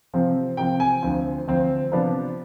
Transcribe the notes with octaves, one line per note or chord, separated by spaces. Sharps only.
C3 F3 C4
C3 F3 C4 G5
G#5
D2 D3 F3 C4
D2 D3 F3 C4
C3 F3 B3 D4